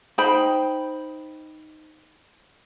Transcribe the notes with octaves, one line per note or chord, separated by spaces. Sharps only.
D#4 C5 G5 B5